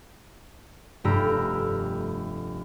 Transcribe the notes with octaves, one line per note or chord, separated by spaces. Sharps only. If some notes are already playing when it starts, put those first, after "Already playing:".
F1 G2 A3 G4 A#5 E6